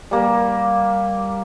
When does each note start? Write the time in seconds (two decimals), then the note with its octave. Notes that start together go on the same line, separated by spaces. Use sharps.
0.11 G3 A#3